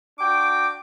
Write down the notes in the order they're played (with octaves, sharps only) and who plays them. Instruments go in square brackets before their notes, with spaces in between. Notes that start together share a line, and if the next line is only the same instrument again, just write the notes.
[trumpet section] D4 F#4 G5 [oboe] D6